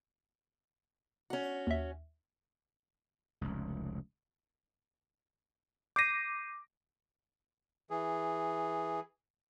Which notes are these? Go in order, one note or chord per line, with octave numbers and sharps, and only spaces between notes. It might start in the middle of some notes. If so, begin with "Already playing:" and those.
C#4 F#4
D#2 E5
F1 C#2
D6 G6 A#6 C7 D#7
E3 G#4